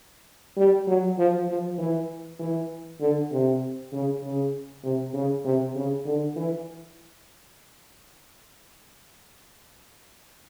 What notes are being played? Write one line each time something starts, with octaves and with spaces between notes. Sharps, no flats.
G3
F#3
F3
F3
E3
E3
D3
C3
C#3
C#3
C3
C#3
C3
C#3
D3
E3